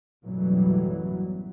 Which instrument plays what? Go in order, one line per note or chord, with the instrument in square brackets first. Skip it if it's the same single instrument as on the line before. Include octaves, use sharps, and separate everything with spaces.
[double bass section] A1 F#2 B2 E3 F#3 G3